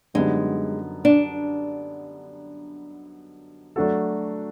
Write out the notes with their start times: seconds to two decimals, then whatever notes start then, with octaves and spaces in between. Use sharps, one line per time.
0.14 F#2 D3 G3 G#3 B3 D#4
1.05 D4
3.76 F#3 A3 D4 F#4 A4